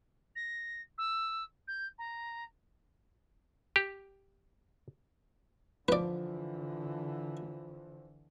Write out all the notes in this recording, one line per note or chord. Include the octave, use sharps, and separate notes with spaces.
A#6
E6
G6
A#5
G4
D3 E3 F3 B4 D5